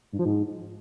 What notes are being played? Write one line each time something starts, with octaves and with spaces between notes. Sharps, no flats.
G2
F3
G#2